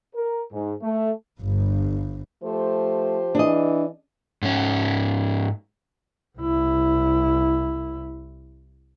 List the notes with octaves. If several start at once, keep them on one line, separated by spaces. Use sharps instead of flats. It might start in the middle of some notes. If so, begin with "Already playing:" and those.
A#4
G#2
A3
G1 G2
F3 A3 G4 C5
E3 D4 G#4 D#5
G#2 C#4
C2 E4